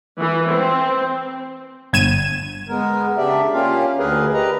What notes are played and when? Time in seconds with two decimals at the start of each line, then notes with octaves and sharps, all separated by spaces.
0.19 E3
0.51 C4
1.93 G1 G#6 D#7 E7
2.69 G#3 B3 A#4
3.18 C#3 D4 G4 D5 E5
3.53 A#3 C#4 F4 G4 F5
3.98 D2 D3 G#4 A#4 B4
4.34 G4 B4 D#5 A#5